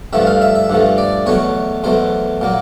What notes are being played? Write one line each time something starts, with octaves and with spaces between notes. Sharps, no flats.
G2 D3 F3 A3 E5
F5
E5
E5
G2 D3 F3 A3
D5
E2 B2 F#3 A3 C#5
E2 B2 F#3 A3 C5
A#2 F#3 A#3